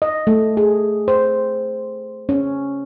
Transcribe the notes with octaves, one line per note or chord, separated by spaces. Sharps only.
D#5
A3
G#4
C5
C#4